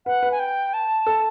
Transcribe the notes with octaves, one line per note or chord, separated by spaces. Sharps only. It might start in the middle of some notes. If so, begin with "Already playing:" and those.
B4 F#5
B4
G#5
G5
A5
A4